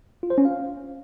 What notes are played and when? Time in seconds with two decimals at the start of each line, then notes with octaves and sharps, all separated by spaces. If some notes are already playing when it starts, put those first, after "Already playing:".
0.23 F4
0.30 C5
0.38 C#4
0.45 F5